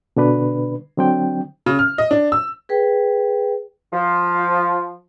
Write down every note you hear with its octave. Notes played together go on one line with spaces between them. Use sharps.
B2 D3 D4 B4
D3 F#3 C4 D4 G5
C#3
F6
D#5
D4
E6
G#4 B4 G5
F3